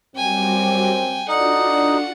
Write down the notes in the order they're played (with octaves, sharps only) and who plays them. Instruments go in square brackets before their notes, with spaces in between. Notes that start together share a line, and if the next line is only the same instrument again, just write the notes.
[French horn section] F#2 C4 [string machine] G3 F#4 D6 [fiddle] G5 G#5
[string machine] D4 F4 F#4 [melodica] D#4 [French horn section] A4 D5 [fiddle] F#5